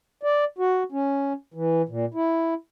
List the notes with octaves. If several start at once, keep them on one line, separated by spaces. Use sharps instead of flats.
D5
F#4
C#4
E3
A#2
E4